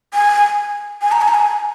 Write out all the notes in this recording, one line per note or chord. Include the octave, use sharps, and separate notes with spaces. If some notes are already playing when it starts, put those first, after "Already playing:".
G#5
G#5
A#5
G#5
A#5
G#5